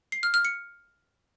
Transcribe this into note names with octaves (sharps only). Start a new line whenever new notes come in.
C7
F6
F6
C#7